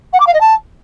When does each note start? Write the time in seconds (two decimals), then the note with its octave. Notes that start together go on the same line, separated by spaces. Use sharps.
0.13 F#5
0.20 D6
0.27 F5
0.34 D#5
0.41 A5